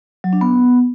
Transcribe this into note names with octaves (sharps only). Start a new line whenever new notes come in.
F#3
D4
B3